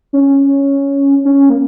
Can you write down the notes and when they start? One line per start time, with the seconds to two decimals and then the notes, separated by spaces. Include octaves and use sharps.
0.13 C#4
1.25 C#4
1.49 A#3